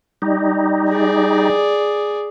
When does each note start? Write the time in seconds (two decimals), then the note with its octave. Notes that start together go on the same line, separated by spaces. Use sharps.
0.22 G3 D#4
0.90 G#4 D5